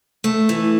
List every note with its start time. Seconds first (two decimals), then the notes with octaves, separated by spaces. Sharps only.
0.24 A3
0.49 E3